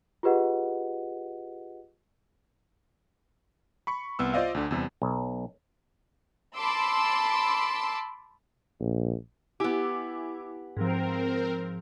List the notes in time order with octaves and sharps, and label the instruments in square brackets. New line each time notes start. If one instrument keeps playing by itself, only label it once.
[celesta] F4 G4 G#4 B4 D#5 F#5
[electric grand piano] B5 C#6 C#7
C2 B3 E6
F4 C5 D5 D#5 F5
D2 D3
E2 C3 G3
[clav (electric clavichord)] B1
[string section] A5 B5 C6 D6 E6
[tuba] A#1
[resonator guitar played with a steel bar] B3 G4 [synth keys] E4 G#5 D6
[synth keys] G#2 F3 [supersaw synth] C4 A#4